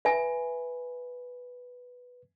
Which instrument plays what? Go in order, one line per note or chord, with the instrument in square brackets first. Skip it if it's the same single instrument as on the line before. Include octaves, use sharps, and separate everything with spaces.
[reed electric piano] B4 [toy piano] E5 G#5